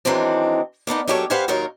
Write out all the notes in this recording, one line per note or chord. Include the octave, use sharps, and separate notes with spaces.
D#3 E3 F#3 G#3 C4 D4
A#3 B3 D4 D#4
F#3 A#3 E4 G4 A4 C#5
G4 B4 C5 F5 F#5 G#5
D#2 F#3 D#4 F4 A#4 C#5